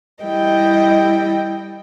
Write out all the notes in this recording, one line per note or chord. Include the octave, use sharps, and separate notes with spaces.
G3 E4 D#5 G5